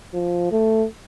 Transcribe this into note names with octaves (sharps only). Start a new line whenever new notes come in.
F3
A3